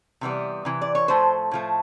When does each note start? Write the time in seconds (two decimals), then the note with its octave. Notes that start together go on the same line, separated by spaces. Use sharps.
0.21 C3 E3 G3 B3
0.65 C3 E3
0.82 D5
0.95 C#5
1.08 A2 F3 A3 C5
1.51 A2 F3 A3